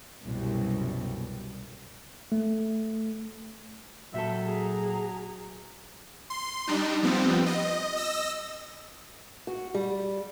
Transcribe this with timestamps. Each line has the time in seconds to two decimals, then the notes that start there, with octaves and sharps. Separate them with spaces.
0.23 C2 F#2 B2 G3
2.32 A3
4.14 A#2 F#3 G4 A4 E5
4.45 G#4 A#5
6.30 C6
6.67 G3 D4 D#4
7.03 F3 G3 B3 C4
7.46 D#5
7.96 D#5 E6 A#6
9.47 F#4
9.74 G3